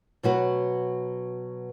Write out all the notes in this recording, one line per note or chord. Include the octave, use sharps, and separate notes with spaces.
B2 F#3 F#4 B4